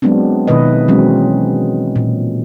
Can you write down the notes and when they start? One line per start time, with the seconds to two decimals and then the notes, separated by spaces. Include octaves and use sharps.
0.02 F#3 G#3 B3 C4 D4
0.48 B2 D#3 E4 B4 D#5
0.88 E3 F#3 G#3 C4 C#4
1.96 A#2